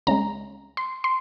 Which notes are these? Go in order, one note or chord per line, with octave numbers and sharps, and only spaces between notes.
C#2 C#3 G#3 A#5
C6
C6